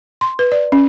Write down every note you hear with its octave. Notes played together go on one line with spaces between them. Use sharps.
C6
B4
D5
C#4